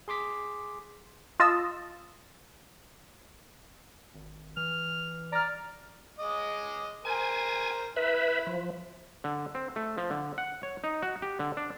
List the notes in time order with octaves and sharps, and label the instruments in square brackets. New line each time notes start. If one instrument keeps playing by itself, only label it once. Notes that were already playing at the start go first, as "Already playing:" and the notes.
[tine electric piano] G#4 C6 D6 B6
[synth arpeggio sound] F4 D#5 A5 E6
[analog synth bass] G#1
[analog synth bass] E3 [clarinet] F6
[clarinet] D5 [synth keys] A#5 F6
[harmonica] G#3 D#5 D6
[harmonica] A#4 C5 [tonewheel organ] G#5
[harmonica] E4 [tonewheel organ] B4 E5
[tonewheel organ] F3
[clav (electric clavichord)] D3
C4
A3
F3
D3
F#5
C#5
D#4
F#4
G4
D3
D4